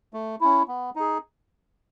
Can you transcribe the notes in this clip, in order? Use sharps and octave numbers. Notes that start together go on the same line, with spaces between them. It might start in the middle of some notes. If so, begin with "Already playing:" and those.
A3
C#4 E4
B3
D#4 G#4